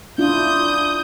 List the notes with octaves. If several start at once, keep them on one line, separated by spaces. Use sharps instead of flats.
D4 E4 F4 D#6 G6